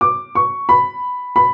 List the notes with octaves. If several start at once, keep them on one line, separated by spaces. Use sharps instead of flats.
D6
C#6
B5
B5